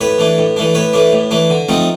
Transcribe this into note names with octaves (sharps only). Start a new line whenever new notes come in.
A2 B4 C#5
E3 A3 D4
A2
E3 A3 D4
A2 B4 C#5
E3 A3 D4
A2
E3 A3 D4
D3
F3 A3 C4 D#4